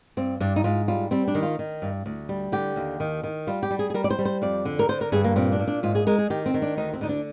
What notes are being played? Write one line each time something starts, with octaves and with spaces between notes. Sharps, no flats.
G2 C4
G2 D4
D#4
G#2 F4
G3 F4
G3 C4
D4
D#3
F4
D#3
G2
D2
G3
D3 G4
D#2
D#3
D#3
G3 F4
G4
G3
G#4
G#4
G3 A#4
D5
C5
G3
C5
F2 D5
D3
A#4
D3 C5
A#4
G2 G#4
A#3
A#2 C4
D4
A#2
D4
G#2 F4
G#4
G#3 A#4
G#4
D#3 G4
C4
D#3
D4
D2 D#4
C4
D3 D#4
D4